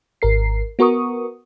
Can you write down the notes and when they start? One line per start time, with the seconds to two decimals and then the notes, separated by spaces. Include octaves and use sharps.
0.22 G#1 A#4 C7
0.79 B3 F#4 A#4 C#6 D#6